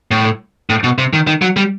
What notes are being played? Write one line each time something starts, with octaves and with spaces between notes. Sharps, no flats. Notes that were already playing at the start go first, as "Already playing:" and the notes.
A2
A2
B2
C3
D#3
D#3
F#3
G3